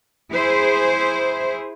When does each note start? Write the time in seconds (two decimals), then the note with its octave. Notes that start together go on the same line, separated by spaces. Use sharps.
0.31 E4 G#4 C5